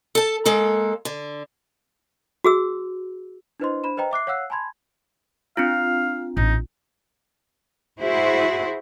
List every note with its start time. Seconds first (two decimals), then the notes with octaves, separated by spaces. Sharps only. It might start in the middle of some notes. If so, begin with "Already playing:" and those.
0.15 A4 A5
0.46 G#3 A#3 A4
1.05 D3
2.44 F#4 G#4 E6
3.60 D4 E4 B4 C5 D#5 C6
3.84 D4 C5 B5 E7
3.97 B4 C5 D#5 G5 A#5
4.11 E5 D6 F#6 C7
4.27 C#5 F5 F#5 E6 F#6 C7
4.50 G#5 A5 B5 C6 G#6
5.57 C4 D4 F4 F5
6.37 A1 D#4
8.02 E4 F#4 G#4 C5